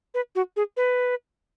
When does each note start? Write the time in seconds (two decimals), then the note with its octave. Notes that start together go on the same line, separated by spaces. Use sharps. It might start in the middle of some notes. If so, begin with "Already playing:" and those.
0.14 B4
0.35 F#4
0.56 G#4
0.77 B4